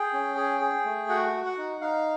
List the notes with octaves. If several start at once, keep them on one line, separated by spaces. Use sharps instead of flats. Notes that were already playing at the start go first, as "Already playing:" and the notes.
Already playing: G#4 G5
C#4
G#4
G#4
A3
F#4 F#5
F#4
F#5
D#4
D#4 F5